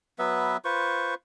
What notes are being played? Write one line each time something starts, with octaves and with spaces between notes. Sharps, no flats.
F#3 B3 B4 E5
F4 B4 C5 C#6